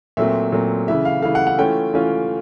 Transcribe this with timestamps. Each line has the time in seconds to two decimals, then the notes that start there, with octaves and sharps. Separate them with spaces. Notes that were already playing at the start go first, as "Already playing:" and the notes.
0.17 A#2 F#3 A3 C4 E5
0.52 A#2 F#3 A3 C4
0.88 C#3 E3 A3 E5
1.05 F5
1.22 C#3 E3 A3 F5
1.35 F#5
1.47 F#5
1.58 E3 A3 C#4 F4 G5
1.93 E3 A3 C#4 F4